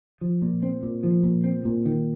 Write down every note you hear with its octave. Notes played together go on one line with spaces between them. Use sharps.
F3
A#2
C4
A#2
F3
A#2
C4
A#2
D#3